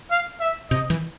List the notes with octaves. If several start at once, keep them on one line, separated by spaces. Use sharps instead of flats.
F5
E5
C3 D#5
E3